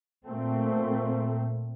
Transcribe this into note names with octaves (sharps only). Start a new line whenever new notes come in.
A#2 A3 C4